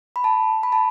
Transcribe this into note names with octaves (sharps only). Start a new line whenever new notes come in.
B5
A5
B5
A5